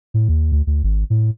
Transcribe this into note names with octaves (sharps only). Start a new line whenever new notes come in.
A2
D#2
D2
D2
G#1
A2